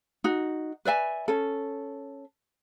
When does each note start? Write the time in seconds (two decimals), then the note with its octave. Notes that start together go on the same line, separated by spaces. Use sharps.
0.24 D#4 F#4
0.85 B4 D5 E5 G#5
1.28 C#4 A4